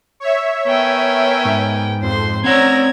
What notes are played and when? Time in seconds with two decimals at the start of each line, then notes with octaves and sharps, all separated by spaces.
0.20 C#5 E5
0.67 B3 A#4 G5 G#5
1.45 G#2
2.01 F2 C5 C6
2.44 C4 C#4 D5 F#5 A#5 E6 G#6 A#6